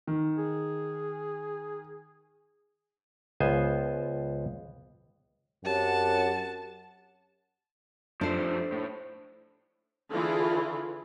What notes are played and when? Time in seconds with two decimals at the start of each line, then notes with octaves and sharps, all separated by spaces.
0.07 D#3
0.38 G#4
3.40 C#2 B3 C5 G#5
5.65 F#2 C4 G4 C#5 F#5 A5
8.21 F3 A3 D4 C5
8.72 A2
10.10 D3 E3 E4 F4 G#4